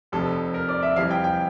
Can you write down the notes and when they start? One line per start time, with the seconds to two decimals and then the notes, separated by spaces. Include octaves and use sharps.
0.12 F1 F2 C3 A4
0.54 A#4
0.69 D5
0.83 E5
0.96 F2 C3 E3 G3 F5
1.11 G5
1.24 G5